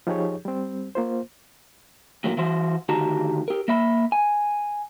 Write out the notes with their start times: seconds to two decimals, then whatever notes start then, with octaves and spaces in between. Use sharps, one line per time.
0.07 F3 D#4 G4 G#4 C#5
0.45 G3 C4
0.95 A#3 F4 C5
2.24 A2 F3 F#3 A#3
2.37 E3 E4 F#4 C5
2.89 D2 D#3 F#4 G4 A5 A#5
3.48 G4 A#4
3.68 A#3 E5 B5
4.12 G#5